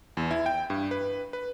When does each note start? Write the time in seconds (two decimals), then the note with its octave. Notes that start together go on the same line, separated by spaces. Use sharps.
0.17 E2
0.31 E4
0.46 G5
0.70 G2
0.91 B4
1.33 B4